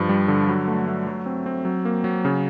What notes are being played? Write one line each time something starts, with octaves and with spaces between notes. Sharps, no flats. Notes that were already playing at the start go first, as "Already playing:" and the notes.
Already playing: G2 F3
G3
D3
F#3
A3
A3
F#3
C4
C4
F#3
A#3
F#3
C#3